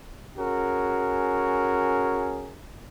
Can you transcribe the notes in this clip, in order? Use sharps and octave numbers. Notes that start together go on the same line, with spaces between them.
C#4 F#4 G#4 A#4